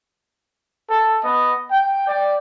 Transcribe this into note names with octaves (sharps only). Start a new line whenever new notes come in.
A4
B3 D#5
G5
D5 G5